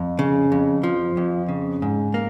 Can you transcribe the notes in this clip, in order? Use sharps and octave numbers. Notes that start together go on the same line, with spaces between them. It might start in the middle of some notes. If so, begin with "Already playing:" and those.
Already playing: F2
C#3
F2
F3
F2
C#3
G#2
A#3